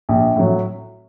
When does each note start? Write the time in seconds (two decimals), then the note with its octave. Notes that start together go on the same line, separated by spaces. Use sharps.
0.09 A#1
0.36 A2 F#3